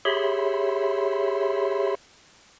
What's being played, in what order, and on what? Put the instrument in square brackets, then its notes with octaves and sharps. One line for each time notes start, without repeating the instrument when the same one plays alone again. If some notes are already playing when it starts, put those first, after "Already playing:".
[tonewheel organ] G4 G#4 C#5 E5 B5 C6